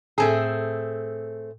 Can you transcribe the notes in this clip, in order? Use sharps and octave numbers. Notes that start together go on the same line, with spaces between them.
A2 A3 C4 G#4 A4